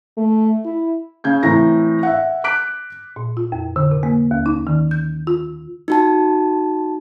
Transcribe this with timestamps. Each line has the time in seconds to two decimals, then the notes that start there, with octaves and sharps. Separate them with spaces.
0.17 A3
0.65 E4
1.24 C#3 G6 G#6
1.43 A2 E3 C4 A#5 A#6
2.03 E5 F#5
2.44 D6 F#6 B6 D7
3.16 A#2
3.37 F4
3.52 F2
3.76 D3
3.91 C3
4.03 A#3
4.31 D#2
4.46 D#4
4.67 D#3
4.91 G6
5.27 F4
5.88 D#4 F#4 A5